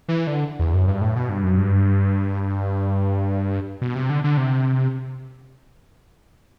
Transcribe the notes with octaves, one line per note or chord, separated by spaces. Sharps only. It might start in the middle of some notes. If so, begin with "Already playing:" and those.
E3
D3
E2
F#2
G2
A2
B2
G2
F#2
G2
B2
C3
D3
D3
C3